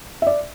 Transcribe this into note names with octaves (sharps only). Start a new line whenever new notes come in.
E5
D5